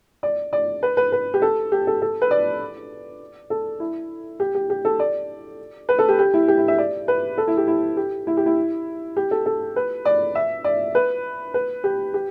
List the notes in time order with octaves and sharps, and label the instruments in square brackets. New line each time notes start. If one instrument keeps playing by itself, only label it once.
[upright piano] D5
D5
B4
B4
B4
G4
A4
G4
A4
A4
B4
D5
A4
E4
G4
G4
G4
A4
D5
B4
A4
G4
G4
E4
G4
E4
E5
D5
B4
A4
E4
G4
E4
G4
E4
G4
E4
G4
A4
A4
B4
D5
E5
D5
B4
B4
G4
G4